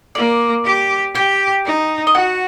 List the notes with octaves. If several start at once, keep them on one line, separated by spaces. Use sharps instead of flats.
A#3 D5
G4
G4 G5
D#4
D#5
F#4 F#5